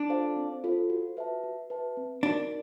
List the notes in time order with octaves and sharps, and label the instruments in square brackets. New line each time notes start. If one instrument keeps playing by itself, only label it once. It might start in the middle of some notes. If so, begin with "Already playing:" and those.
Already playing: [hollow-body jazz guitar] D4
[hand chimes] F4 A4 C5 F5
C4
F4 A4 C5 F5
F#4
B4 E5 A5
F#4
B4 E5 A5
C4
[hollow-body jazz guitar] D4 [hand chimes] D#4 F#4 A#4 D5